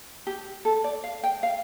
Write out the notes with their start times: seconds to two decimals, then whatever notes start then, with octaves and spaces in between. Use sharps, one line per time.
0.27 G4
0.65 A4
0.84 D5
1.04 F5
1.24 G5
1.43 F5